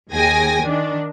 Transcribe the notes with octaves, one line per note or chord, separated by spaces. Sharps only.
D#2 G#4 G5 G#5 G#6 A#6
D#3 D4